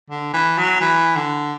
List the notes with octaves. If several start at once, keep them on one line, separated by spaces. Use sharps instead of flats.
D3
E3
F#3
E3
D3